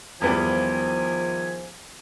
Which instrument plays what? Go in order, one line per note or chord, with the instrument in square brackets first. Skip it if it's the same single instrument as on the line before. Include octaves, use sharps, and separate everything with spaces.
[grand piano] E2 G3 B3 [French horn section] D#3 F3 C5 [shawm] G#5